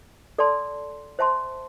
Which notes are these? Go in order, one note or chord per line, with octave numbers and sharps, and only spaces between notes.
A4 D5 A5 C6
C5 E5 A5 C6